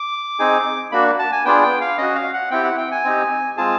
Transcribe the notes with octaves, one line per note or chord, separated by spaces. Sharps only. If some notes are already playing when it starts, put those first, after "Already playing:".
Already playing: D6
C4 D#4 G#4
A#3 D4 F#4 B5
A5
G#5
B3 D4 F4 G#4 G5
G5
F5
C#4 F#4 D#5
F5
F#5
C4 E4 G4 G5
F#5
G5
G#5
C4 D#4 G4
G#3 C4 F4 G#4 A5